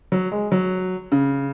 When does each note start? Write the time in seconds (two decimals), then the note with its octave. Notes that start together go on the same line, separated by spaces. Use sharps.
0.12 F#3
0.32 G#3
0.52 F#3
1.12 C#3